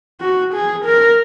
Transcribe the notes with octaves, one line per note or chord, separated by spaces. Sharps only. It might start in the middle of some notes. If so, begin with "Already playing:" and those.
F#4
G#4
A#4